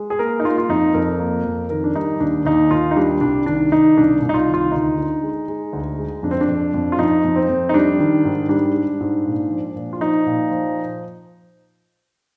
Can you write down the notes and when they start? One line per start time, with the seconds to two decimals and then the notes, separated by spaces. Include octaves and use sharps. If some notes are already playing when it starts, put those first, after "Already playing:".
Already playing: G#3
0.10 G#4
0.19 A#3 A#4
0.40 D#4
0.45 A#3 F4
0.58 F4
0.69 F2 D#4
0.94 F2 A#4
1.20 A#3
1.45 F2
1.70 D#3 A#4
1.84 D4
1.95 G3 D#4
2.20 D#2 D4
2.45 D#2 D#4
2.71 D#2 F4
2.91 D#4
2.97 G3 D4
3.21 C2 D4
3.46 D#3 D4
3.72 D#3 D#4
3.97 C2 D4
4.22 C2
4.29 D#4
4.34 F4
4.48 D#3
4.54 F4
4.72 D2 D#4
4.97 D3
5.23 G#3
5.48 G#3
5.73 D2
5.99 G#3
6.23 F2 D4
6.31 C4
6.41 D4
6.48 F2
6.74 F2
6.92 F4
6.99 F2 D#4
7.24 F2
7.36 C4
7.49 F2
7.69 D#4
7.74 G3 D4
8.00 D#3
8.25 G#2
8.49 G3 D4
8.75 G3
9.00 G#2
9.25 A#2
9.50 F3
9.76 A#2
9.93 F4
10.00 F3 D#4
10.26 A#2
10.51 F3